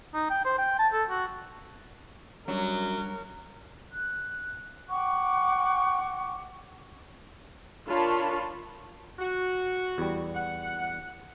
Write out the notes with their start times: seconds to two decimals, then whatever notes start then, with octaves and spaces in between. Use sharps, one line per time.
0.14 D#4
0.30 G5
0.45 C5
0.58 G5
0.79 A5
0.93 A4
1.10 F#4
2.48 F#2 F#3 G3 D4 A#4
3.91 F#6
4.90 F#5 G5 C#6 D6
7.88 D4 F4 A#4 C#5 A5 B5
9.19 F#4
9.98 E2 G3
10.34 F#5